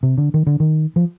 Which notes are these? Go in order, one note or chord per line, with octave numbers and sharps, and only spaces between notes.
C3
D3
D#3
D3
D#3
F3